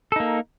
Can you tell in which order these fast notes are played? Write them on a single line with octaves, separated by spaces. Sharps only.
A4 D#4 A#3